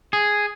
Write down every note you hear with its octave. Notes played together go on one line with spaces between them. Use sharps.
G#4